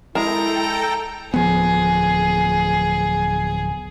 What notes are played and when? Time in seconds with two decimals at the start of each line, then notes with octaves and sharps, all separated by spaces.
0.15 G#3 E4 A4 A#4 G5 A5 A#5
1.34 D1 F3 B3 G#4